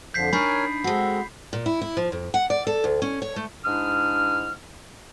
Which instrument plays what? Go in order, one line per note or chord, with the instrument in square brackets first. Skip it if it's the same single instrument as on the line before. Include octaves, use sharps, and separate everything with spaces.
[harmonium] F2 D3 F3 [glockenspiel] G6 B6 C7
[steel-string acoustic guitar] D4 D#4 [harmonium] A#4 C#5 G#5 [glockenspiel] B5 G6 C7
[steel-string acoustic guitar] G#3 F#4 [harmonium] C4 A4
[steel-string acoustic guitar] A#2
E4
E4
F3
F2
F#5
D5
A4
D2
C#4
C#5
A3
[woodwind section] G#2 D4 E4 D#6 F6